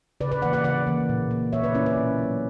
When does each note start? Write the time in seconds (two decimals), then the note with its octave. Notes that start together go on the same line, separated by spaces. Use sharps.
0.20 C#3 B4 D5
0.32 B4 D5
0.42 E3 A#3 D5 F#5
0.53 D5 F#5
0.64 C#3 D5 F#5
0.87 E3 A#3
1.09 A#2
1.31 A#3
1.53 A#2 C#5 E5
1.63 B4 D5
1.74 A#3 C#4 E4
1.86 B4 D5
1.96 B2
2.18 F#3 A#3